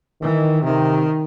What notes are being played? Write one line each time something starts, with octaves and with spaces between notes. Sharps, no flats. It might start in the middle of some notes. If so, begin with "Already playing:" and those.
D#3 E3
C3 D#3